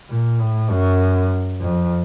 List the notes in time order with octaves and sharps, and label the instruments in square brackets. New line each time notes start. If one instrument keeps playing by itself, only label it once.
[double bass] A#2
A2
F#2
F2